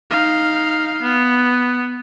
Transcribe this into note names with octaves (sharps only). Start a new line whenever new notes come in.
D#4 F5
B3